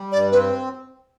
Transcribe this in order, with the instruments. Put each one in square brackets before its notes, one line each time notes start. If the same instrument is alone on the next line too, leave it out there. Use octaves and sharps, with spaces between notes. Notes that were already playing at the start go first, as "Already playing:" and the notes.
Already playing: [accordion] G3
[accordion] G2 [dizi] D5
[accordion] C4 [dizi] B4